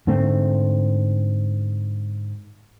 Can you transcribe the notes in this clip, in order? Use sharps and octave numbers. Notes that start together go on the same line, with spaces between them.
G#2 D3 A3 C4